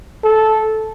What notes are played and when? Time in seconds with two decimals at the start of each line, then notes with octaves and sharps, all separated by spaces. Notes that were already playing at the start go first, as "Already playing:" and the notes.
0.24 A4